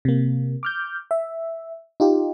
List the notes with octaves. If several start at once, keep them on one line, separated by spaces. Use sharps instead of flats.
C3 A#3
D6 F6 G6
E5
D#4 F4 G4